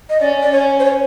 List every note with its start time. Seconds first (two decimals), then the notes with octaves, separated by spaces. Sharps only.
0.10 D#5
0.20 C#4 D5
0.42 D5
0.52 C#4 C#5
0.80 C5
0.85 C#5